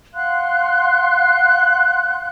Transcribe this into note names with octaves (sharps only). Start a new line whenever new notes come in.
F5 F#5 C6 F#6